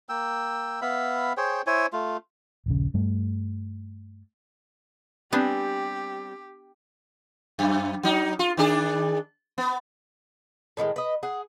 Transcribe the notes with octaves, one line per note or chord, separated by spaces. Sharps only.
A#3 G5 E6
B3 E5 F5 B5
G#4 C5 C#5 G5
E4 C5 C#5 G#5
A3 F4
D#1 A#1 C#3
G2 G3 A3
G3 B3 C4 D4 G4 G#5
F#2
F#3 D#4
F4
D#3 D4 G#4
B3
A2 D#3 E3 G#3
B4 D#5
G#4 F#5